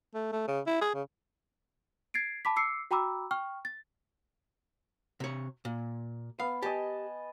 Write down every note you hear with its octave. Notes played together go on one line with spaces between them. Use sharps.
A3
A3
C#3
E4
G#4
C#3
G#6 A6 C7 D7
A5 B5 D6 B6
D6 E6 C7 C#7
F#4 G5 A#5 B5 D6 E6
G5 C#6 F6
A6
C3 C#5
A#2
B3 F5
G4 D#5 G#5 A5